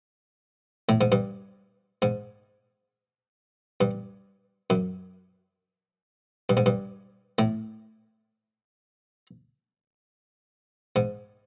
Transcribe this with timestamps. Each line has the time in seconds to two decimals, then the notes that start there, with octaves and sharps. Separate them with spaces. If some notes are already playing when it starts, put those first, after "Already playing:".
0.89 A2
1.01 G#2
1.12 G2
2.02 G#2
3.81 G2
4.70 F#2
6.49 G2
6.57 G#2
6.66 G2
7.39 A2
10.96 G#2